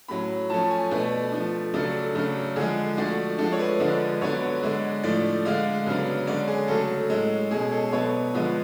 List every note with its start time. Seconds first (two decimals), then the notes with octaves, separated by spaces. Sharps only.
0.08 A2 F#3 C#4 B5
0.50 F3 A3 C#4 A5
0.70 G#5
0.91 B2 A3 D4 B4
1.32 F3 A3 D4
1.74 C#3 F#3 A3 D4 A4
2.15 C#3 F#3 A3 D4
2.56 D3 F3 G#3 G#4
2.97 F3 A3 D4 F#4
3.39 F3 G#3 D4 A4
3.52 C#5
3.59 B4
3.80 D3 F3 G#3 D4
4.22 D3 F#3 B3 D4 C#5
4.63 D3 G#3 D4
5.03 A2 F3 A3 D4 D5
5.45 D3 G#3 D4 F5
5.86 C#3 F#3 B3 D4
6.27 D3 G#3 C#4 D5
6.48 G#4
6.68 C#3 F#3 A3 A4
7.10 A2 G#3 C#4
7.51 B2 G#3 C#4 G#4
7.72 A4
7.92 B2 F#3 B3 D4 C#5
8.34 D3 F3 G#3 B3